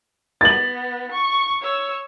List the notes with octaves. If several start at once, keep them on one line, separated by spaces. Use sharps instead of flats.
B3 A6 F#7
C#6
C#5 E6